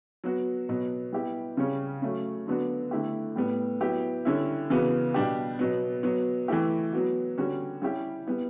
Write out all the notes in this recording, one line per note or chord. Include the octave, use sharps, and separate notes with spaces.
F#3 B3 F#4
B2 F#3 B3
G3 B3 E4 G4
C#3 G3 C#4
F#3 A3 C#4
D3 F#3 B3 D4 F#4
D3 A3 E4 G4
A2 G3 B3
F#3 B3 E4 G4
D3 G3 C#4 E4
C#3 E3 B3 F#4
B2 G3 D4 G4
B2 F#3 B3
F#3 B3 F#4
E3 A3 E4 G4
F#3 B3 F#4
D3 G3 C#4 F#4
G3 C#4 E4 G4
G3 B3 E4